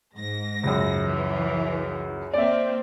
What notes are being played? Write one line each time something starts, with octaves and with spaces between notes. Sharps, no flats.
G#2 A#6
C#2 F#2
E3
A#3 C4 D5 E5